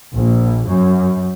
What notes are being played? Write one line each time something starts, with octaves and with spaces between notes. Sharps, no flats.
A#1
F#2